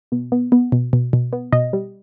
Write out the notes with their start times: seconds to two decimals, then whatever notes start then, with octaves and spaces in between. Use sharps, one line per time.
0.12 B2
0.32 B3
0.52 B3
0.72 B2
0.93 B2
1.13 B2
1.33 B3
1.52 B2 D#5
1.73 G3